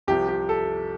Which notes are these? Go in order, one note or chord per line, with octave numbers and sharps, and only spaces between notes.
C2 C3 F3 G4
G4
A4